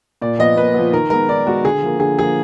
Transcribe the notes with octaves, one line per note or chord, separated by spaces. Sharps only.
A#2 D5
F3 B3 D#5
A#2 B4
F3 B3
D#3 A#4
G#3 B3 A#4
D#3 D5
G#3 B3 F#4
D3 G#4
F3 A#3
D3 G#4
F3 A#3 G#4